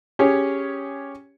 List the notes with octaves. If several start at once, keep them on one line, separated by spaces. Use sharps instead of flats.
C#4 G4 G#4 C#5